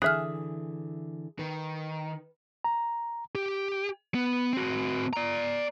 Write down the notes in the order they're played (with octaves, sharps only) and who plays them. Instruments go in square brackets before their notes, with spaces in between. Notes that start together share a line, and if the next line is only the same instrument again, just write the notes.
[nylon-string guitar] D3 E3 [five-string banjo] G#4 E5 [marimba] F6 F#6
[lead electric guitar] D#3 [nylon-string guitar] B4
[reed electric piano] A#5
[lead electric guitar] G4
B3
C4 F#4
D5 A#5